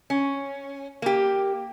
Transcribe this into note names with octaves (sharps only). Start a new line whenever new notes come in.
C#4
A#3 G4